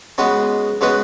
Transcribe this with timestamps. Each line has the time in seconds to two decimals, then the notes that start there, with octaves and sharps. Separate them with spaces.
0.18 C#3 G#3 B3 F#4 B4
0.81 C#3 G#3 B3 F#4 B4